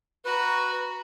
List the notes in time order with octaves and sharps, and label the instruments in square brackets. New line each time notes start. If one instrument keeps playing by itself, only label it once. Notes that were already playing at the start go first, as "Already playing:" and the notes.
[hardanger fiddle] F#4 A#5 [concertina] B4